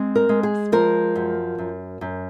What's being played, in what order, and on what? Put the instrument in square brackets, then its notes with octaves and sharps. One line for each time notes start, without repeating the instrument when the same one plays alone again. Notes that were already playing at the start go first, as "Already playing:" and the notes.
Already playing: [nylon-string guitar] G#3 C4
A#4
G#3
G#4
F3 A#4
F#2
F#2
F#2